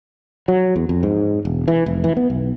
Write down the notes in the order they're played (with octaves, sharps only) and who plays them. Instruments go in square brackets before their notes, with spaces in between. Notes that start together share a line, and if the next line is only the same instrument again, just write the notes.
[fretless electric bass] F#3
E2
F2
G#2
E1
E3
F1
E3
B3
B1